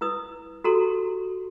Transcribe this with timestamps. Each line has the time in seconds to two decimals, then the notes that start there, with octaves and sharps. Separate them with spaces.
0.01 E4 B4 D#6
0.64 F#4 G4 A4 A#5 C6